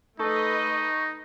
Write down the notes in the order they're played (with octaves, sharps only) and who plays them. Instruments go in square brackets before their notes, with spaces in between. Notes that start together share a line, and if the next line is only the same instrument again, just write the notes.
[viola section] A3 B4 D#5 [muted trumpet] D#4 [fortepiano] A4 [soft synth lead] C#6